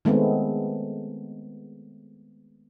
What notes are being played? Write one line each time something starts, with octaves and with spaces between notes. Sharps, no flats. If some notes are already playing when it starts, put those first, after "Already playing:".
D#3 G#3 A3 B3 C4